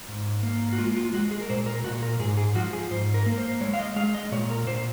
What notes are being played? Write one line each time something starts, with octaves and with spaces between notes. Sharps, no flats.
G#2
A#3
F#4
G#3 F4
F4
G#3 F#4
G#4
A#4
A#2 C5
A#4
A#2 F#4
A#4
G#2 G#4
G#4
F3 F#4
G#4
G#2 C5
A#4
A#3
C5
G#3 C#5
F5
D#5
G#3 F5
D#5
A#2 C#5
A#4
A#2 C5